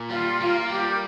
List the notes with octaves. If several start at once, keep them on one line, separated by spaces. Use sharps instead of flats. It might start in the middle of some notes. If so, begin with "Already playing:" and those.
Already playing: A#2
G3 F4
A#3 F4
F4
G3 G4
A#4